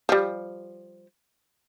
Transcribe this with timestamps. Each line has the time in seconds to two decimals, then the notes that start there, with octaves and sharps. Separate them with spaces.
0.09 F3 G3